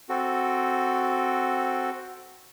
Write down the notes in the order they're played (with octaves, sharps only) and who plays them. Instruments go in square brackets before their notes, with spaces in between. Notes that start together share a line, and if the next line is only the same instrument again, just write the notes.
[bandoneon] C4 F#4 A4